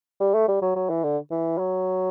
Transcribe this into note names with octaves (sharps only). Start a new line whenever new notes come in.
G3
A3
G3
F#3
F#3
E3
D3
E3
F#3